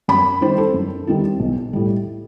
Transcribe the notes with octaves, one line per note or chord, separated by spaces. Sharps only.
F#2 B5
D#3 G3 C4 E4 C5
A4
F#2
D#3 G3 C4 E4
B1
A2 G3